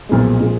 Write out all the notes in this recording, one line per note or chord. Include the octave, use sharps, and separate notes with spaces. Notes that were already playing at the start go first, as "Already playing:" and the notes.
B1 A#2 F3 G#3
A#2 F3 G#3